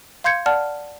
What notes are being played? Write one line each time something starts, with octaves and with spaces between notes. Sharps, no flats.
F5 C6 G6 G#6 C#7
D5 F#5 A5 F6